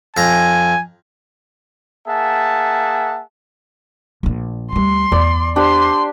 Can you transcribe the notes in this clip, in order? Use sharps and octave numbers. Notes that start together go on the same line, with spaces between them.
F2 G#5 A#5
A#3 G#4 E5 F#5 A5
A#1 D4
D2 G3 C6
E2 D5
D4 G4 C5 C6